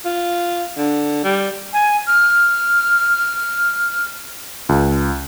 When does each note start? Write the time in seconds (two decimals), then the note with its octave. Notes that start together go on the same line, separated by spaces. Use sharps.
0.05 F4
0.77 D3
1.24 G3
1.73 G#5
2.07 F6
4.69 C#2